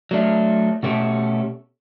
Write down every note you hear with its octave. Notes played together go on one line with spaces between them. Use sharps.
F#3 A3 D4
B2 A3 C#4 G4